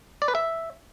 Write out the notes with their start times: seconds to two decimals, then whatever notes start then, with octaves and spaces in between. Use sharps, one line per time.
0.22 D5
0.28 B4
0.35 E5